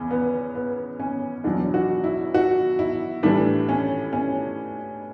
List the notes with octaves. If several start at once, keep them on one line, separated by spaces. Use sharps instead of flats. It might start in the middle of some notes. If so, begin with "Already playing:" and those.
Already playing: E2 C#3 C#4
B3
B3
C#4
E2 B2 F#3 D4
F#4
E4
F#4
E4
A2 E3 G3 D4
C#4
C#4